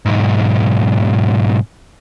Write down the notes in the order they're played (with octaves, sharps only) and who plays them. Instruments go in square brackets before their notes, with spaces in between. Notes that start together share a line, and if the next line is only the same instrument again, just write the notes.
[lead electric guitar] B1 G#2